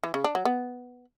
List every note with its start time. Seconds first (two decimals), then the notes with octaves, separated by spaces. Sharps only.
0.04 E3
0.14 C#3
0.24 D4
0.35 F#3
0.45 B3